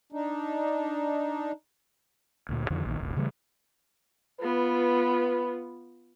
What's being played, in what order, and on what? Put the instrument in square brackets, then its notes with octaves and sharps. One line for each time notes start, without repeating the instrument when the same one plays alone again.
[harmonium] D4 D#4
[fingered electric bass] D2 A#2
F2 D3 D#3 F3
A#1 D#3
D1 G1
C#3 E3 G3 A3
[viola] B3 F4 [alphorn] B4